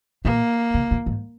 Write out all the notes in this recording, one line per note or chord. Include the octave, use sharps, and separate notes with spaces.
A#2 A#3
C3
A#2
G#2